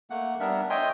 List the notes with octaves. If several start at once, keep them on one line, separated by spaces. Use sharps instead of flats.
A3 A#3 F#5
G3 B3 D4 A#4 E5
C#5 D#5 E5 G5 G#5 C6